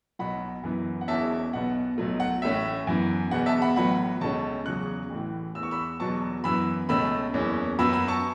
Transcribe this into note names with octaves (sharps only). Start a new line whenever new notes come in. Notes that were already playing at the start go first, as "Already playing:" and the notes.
B1 B2 F#3 F#5 B5
F#2 E3 B3
F#5
E1 E2 E3 C#4 E5 A5
B1 B2 B3 F#5
B1 B2 F#3 A3
F#5
A1 A2 A3 C#4 E5
F#2 E3 B3
E1 E2 B2 B3 F#5
E5 A5
F#5 B5
A1 A2 F#3 B3 F#5 B5
C#2 B2 A3 C#4 A5 C#6
E2 C#3 F#3 C#6 F#6
A1 A2 E3
E2 E3 B3 E6
C#6
B5 E6
E2 B2 F#3 B3 A5 C#6
F#2 E3 B3 B5 E6
C#2 B2 A3 C#4 B5 E6
F#1 E2 E3 C#4
F#2 F#3 B3 B5 E6
B5 E6
A5 C#6